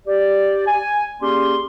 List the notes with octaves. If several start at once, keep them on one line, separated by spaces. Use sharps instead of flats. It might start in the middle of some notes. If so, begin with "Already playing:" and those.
G4 D5
G#5
A#3 C#4 G4 G#4 D5 C6